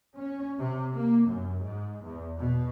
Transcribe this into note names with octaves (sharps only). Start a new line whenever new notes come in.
C#4
C3
A#3
F#2
G#2
E2
B2